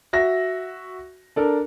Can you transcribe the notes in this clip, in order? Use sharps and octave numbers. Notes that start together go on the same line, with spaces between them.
F#4 E5 A#6
D4 A4 A#4